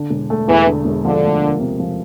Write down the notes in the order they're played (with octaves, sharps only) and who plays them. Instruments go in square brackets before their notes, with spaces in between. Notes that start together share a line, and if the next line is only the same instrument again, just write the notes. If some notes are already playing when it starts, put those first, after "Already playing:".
Already playing: [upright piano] D3
E1
A3
[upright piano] E2 [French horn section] E3
[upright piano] D3
E1
[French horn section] D3 [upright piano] F3
[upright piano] D2
A#3
C3
F3